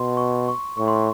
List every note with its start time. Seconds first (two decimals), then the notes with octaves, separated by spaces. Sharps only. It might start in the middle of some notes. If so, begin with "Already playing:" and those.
Already playing: B2 C6
0.17 C#6
0.48 C#6
0.77 A2 C#6
0.88 C6
0.96 C#6